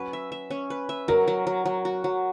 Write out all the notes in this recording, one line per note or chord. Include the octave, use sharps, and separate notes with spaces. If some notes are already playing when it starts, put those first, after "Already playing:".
Already playing: F#3 C#4 B4
E5
E5
C#4
B4
E5
F#3 A#4
F#3
F#3
F#3
F#4
F#3